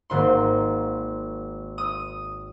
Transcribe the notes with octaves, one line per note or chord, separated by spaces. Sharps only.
G#1 G#2 D#3 A#3 C6
D#6